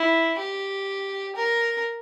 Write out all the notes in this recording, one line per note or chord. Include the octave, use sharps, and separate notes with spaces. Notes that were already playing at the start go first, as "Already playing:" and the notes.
Already playing: E4
G4
A#4